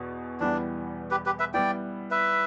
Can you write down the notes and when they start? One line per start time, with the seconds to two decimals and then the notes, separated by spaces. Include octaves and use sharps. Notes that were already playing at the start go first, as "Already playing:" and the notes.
Already playing: E2 B2
0.40 E2 E3 G3 B3 D4
1.11 G4 B4
1.26 G4 B4
1.39 B4 E5
1.54 G3 B3 E4 D5 G5
2.11 B4 E5